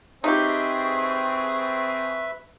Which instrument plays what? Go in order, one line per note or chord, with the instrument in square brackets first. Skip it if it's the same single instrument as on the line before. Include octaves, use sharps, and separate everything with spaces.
[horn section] C4 G#4 [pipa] D#4 G4 [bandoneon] B4 E5 [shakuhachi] C#6